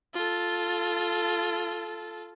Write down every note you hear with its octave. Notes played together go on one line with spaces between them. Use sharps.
F4 A4